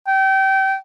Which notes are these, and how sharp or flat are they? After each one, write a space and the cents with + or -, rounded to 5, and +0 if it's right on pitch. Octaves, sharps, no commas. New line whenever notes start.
G5 -25